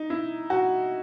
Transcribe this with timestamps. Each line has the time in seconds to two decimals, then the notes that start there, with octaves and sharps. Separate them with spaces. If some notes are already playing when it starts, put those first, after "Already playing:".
Already playing: D#4
0.10 E4
0.50 F#4